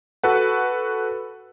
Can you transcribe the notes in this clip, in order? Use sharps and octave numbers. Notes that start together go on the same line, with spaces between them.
F#4 A4 B4 F#5